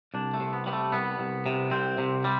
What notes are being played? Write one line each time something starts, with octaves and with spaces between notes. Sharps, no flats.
C2 D4
A3
C3
B3
G3 B3
A3
C2 B3
C2
C3
C2 C4
C3
G3